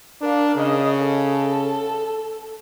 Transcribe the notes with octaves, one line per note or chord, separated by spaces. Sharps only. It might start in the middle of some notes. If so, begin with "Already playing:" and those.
D4 A#4 F5
C#3 D#5
A4